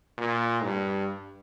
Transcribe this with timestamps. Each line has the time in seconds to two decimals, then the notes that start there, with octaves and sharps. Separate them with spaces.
0.18 A#2
0.64 G2